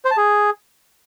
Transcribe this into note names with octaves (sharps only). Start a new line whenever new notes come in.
C5
A5
G#4